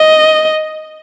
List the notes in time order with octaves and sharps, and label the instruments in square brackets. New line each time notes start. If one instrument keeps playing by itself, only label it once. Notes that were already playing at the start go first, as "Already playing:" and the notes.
Already playing: [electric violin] D#5